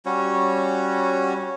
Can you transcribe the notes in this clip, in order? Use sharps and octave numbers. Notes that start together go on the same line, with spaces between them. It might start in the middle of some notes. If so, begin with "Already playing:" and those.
G3 C#4 F#4 C#5